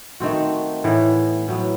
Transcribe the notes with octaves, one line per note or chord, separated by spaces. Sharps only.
D#3 A3 C4 F#4
A2 E3 B3
A2 F#3 B3